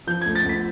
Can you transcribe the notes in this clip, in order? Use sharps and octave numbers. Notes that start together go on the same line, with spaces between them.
F3 G6
D2 G#6
A6
D2 B6